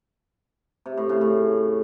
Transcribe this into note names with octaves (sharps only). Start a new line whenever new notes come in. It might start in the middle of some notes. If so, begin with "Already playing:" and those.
C3
A2
C#3
A2